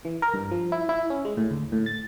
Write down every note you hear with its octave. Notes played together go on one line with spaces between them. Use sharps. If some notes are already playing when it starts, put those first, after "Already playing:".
E3
A#4
G2
F3
E4
E4
C#4
G#3
A2
D2
A2
A6